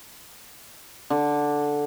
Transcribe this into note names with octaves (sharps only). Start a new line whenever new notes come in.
D3